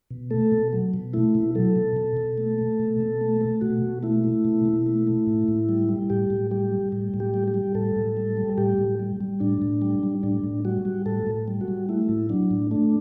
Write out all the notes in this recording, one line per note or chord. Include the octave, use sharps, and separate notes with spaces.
B2
A3 A4
B2
F#3
B2
A3 E4
B2
F#3 A4
B2
B2
B2
A3
A3
B2
B2
A3
A3
B2 F#4
B2
A3 E4
A3
B2
B2
A3
A3
A2
A2
G3
G3
A2 G4
A2
G3 G4
G3
A2
A2
G4
G3
G4
G3
A2 A4
A2
G3
G3
A2 G4
A2
G3
G3
A2 D4
A2
G3
G3
A2 D4
A2
G3 F#4
G3
A2 A4
A2
G3
F#4
G3
A3 E4
A2
F#3 D4
A2
A3 D4